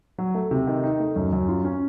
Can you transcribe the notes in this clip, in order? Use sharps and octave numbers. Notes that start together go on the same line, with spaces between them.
F#3
A3
C3
D#3
D#4
A3
F#2
F#2
F4
C#4